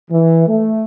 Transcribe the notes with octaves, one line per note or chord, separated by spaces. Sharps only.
E3
A3